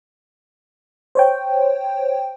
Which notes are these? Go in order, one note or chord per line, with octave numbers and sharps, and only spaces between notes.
C5 C#5 G5